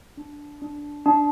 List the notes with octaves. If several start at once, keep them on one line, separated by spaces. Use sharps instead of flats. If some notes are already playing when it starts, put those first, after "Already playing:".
D4
D4
D4